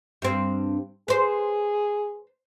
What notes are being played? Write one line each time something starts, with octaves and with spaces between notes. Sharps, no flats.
G2 C4
G#4 B4 C5